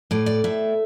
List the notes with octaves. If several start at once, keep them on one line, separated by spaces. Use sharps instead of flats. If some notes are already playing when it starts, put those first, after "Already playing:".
A2 D5
D5
A2 E5